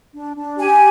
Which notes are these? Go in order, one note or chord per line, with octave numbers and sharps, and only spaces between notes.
D4
D4
G4 G#5